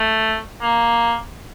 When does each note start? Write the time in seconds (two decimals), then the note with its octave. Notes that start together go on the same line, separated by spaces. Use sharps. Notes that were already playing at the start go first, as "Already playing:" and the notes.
Already playing: A3
0.61 A#3